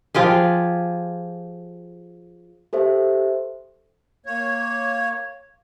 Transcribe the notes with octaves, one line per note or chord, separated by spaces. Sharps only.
F3 F4 G4 G#4
G4 A4 C5 E5
A#3 C#5